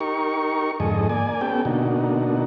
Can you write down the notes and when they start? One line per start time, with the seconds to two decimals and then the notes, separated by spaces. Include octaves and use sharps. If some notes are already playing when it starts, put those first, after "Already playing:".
0.01 D#4 G4 A#4 C#6
0.80 F2 G#2 D3 G#4 A4 D#5
1.09 A#3 D5 G#5
1.41 B3 C#4 G4 A4 G5
1.65 B2 D3 A#3 D4 D#4 F#4